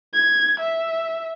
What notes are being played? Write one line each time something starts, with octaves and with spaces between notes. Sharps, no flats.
G#6
E5